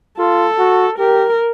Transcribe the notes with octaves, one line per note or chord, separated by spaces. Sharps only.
F4 A4
F#4
G4 A#4